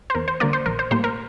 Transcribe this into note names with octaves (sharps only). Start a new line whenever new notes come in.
C5
E2 A#4
C5
D3 G3 A#3 A#4 D5
C5
A#1 A#4
C5
A2 G3 A#3 C5
A#4